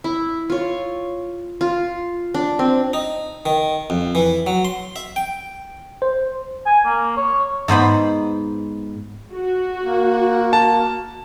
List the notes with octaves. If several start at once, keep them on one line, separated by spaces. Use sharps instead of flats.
E4
F4 C#5
F4
D4
C4
D#4
D#3
F2
E3
F#3
C6
E5
G5
C5
G#5
A#3
C#5
G#2 B3 C5 B5
F#4
A#3
A5